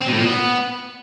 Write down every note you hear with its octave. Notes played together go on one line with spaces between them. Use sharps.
C4
B2
A2
A#2
B3